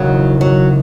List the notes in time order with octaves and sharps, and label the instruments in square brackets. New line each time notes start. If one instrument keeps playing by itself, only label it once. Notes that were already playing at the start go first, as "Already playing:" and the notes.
Already playing: [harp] E1 D#2 C#3 [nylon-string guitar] F#3
[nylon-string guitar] F#3